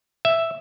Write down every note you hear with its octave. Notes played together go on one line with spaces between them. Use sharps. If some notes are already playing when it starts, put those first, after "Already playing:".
E5